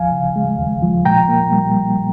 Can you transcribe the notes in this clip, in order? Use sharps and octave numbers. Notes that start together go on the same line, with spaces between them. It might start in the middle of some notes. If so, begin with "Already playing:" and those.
Already playing: D#2 F3 F5 G#5
C#3
G#3
D#2
F3
A#2 G5 A#5
A#3
G3
A#2